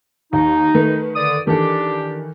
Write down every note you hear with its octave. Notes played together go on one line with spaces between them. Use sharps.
D#2 D#4
D#3 A3 B4
D3 D5 D#6
D#3 E3 D4 G4 A4